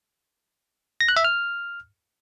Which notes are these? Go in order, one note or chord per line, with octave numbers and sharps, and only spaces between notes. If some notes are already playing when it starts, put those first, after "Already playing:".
A#6
F#6
E5
F6